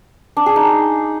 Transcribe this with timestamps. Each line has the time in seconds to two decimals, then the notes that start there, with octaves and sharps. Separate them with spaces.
0.37 D4
0.46 G#4
0.56 D#4